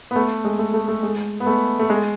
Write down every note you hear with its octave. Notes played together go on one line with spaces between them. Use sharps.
B3
A3
G#3
A3
A3
A3
G#3
B3
A3
A3
G#3